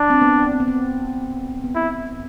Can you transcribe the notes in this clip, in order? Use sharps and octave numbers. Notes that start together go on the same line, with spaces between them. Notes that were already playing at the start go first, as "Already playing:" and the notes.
Already playing: D4
C4
B3
C4
B3
C4
B3
C4 E4